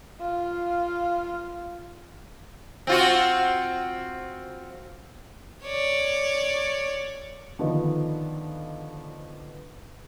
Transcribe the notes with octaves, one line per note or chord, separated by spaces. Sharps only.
F4 F5
C4 F4 F#4
C#5 D5
D3 D#3 F3 B3 D#4